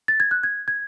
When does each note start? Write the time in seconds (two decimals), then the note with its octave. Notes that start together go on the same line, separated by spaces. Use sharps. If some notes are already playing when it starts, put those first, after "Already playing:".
0.08 A6
0.20 G#6
0.31 F#6
0.44 G#6
0.68 G#6